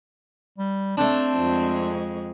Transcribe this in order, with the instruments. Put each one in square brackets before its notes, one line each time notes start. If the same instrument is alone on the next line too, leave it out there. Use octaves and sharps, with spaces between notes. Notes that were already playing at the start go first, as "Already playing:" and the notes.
[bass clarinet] G3
[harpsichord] A3 D4 [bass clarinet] C4
[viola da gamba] F2 G#3